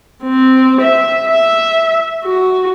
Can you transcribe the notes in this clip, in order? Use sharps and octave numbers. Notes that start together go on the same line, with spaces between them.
C4
E5
E5
F#4